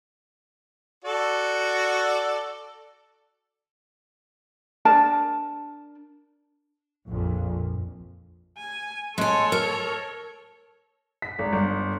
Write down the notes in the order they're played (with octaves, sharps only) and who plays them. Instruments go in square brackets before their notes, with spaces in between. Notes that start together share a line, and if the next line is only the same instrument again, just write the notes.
[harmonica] F#4 A4 D5
[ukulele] D4 A#4 A5
[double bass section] A#1 F2
[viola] G#5
[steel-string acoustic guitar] G#3 G#5 [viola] A4 C#5
[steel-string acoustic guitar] A#4
[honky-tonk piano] B6
G#1
G1